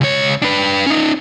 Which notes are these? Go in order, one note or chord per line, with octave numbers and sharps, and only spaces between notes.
C#2 C#5
D4 B4
C#4 D#4